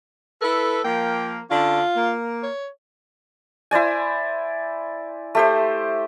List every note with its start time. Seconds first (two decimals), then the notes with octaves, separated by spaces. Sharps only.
0.42 E4 A4 B4
0.84 F3 A#3 G5
1.51 D3 C#4 D4 F4
1.96 A#3
2.43 C#5
3.71 E4 C5 D5 G#5
5.35 A3 G4 C5